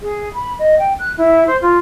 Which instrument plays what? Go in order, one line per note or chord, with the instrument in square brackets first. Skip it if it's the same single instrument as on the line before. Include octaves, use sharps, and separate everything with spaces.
[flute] G#4
B5
D#5
G5
F#6
E4
C5
F4